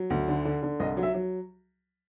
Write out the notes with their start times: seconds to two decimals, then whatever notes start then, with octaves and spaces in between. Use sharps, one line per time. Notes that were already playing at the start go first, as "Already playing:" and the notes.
Already playing: F#3
0.10 D2
0.28 D3
0.45 D3
0.63 D3
0.80 C2 D#5
0.97 F#3
1.03 E5
1.14 F#3